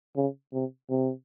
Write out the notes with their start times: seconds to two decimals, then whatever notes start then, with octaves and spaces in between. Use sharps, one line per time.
0.16 C#3
0.53 C3
0.90 C3